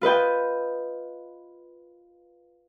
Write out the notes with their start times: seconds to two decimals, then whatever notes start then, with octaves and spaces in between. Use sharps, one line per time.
0.01 F4 B4 D#5 G5